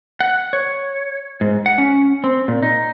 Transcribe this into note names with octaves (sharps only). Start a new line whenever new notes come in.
F#5
C#5
G#2
F#5
C#4
C4
A#2
D#4